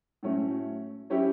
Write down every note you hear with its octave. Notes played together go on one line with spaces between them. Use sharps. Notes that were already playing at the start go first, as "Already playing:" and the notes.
A2 F#3 A3 C#4
F#3 C#4 E4 G4